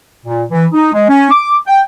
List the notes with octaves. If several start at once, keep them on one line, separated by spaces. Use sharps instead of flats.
A#2
E3
D#4
G#3
C#4
D6
G5